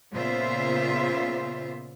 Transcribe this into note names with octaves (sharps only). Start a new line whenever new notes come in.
A#2 C#3 B3 F4 C5 E5